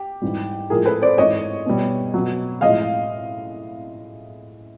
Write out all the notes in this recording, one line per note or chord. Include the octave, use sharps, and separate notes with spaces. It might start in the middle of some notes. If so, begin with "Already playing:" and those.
Already playing: G4
G#2 E3 G3
A2 F3 G#3 G#4 A#4
A4 B4
C5 D5
G#2 E3 G#3 C#5 D#5
B2 G3
B2 F#3
A2 F3 G#3 D#5 F5